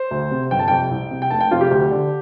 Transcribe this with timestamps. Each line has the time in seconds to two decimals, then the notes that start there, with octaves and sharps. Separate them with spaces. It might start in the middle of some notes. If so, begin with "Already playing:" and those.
Already playing: C5
0.11 D2
0.31 C3
0.51 G1 G5
0.59 A5
0.68 F2 C3 G5
0.91 C2
1.11 C3
1.22 G5
1.30 F1 A5
1.41 G5
1.51 F2 C3 F4
1.61 G4
1.71 D2
1.91 D3